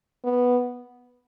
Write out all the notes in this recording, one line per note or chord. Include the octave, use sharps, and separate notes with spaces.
B3